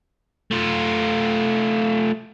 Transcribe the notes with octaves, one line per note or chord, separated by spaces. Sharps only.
A3 F4